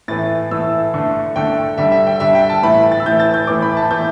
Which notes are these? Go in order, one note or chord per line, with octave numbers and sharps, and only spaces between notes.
A2 E3 A3 A6
A2 E3 A3 E6
D3 A3
D3 A3 G5
D3 G3 E5
E5
G5
D3 G3 E5
G5
A5
A2 E3 A3 B5
A6
E6
A2 E3 A3 G6
A6
G6
A2 E3 A3 D6
B5
A5
A2 E3 A3 G6